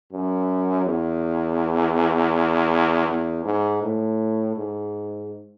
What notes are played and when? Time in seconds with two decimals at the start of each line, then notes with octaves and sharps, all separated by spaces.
0.13 F#2
0.86 E2
3.08 E2
3.45 G#2
3.82 A2
4.57 G#2